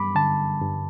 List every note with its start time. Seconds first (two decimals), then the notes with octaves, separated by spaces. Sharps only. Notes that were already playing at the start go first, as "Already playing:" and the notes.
Already playing: G2 G3 B5 D6
0.15 D3 A5
0.61 G2